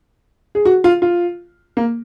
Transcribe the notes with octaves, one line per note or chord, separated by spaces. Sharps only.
G#4
F#4
F4
F4
A#3